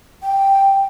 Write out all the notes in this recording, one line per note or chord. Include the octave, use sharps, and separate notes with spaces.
G5